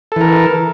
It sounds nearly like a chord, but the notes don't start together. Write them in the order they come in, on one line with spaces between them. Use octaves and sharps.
A4 E3 A#4